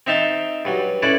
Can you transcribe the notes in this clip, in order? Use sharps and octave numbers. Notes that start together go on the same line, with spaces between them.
C4 D#4 E5 F5 A5 C6
G2 F#3
C#4 E4 A4 B4 D5